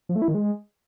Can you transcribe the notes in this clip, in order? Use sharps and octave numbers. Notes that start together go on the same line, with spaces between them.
F3
A3
E4
D#3
G#3